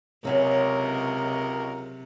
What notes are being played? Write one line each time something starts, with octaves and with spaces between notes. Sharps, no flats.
C#2 C3 F#3 C#4 E4 A#4